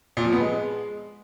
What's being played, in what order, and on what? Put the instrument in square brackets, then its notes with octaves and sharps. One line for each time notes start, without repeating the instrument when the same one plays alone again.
[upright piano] A#2
F3
B3
G#3